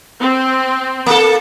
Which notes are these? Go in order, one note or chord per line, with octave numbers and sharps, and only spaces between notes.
C4
A#3 A4